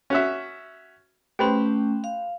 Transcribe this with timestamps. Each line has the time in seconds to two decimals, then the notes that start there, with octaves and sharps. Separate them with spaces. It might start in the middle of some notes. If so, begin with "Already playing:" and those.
0.10 C#4 F#4 E5
1.39 A3 C#4 G4 B4 C5
2.04 F5